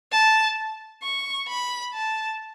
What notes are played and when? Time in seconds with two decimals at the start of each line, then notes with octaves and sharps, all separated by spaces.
0.12 A5
1.03 C#6
1.48 B5
1.94 A5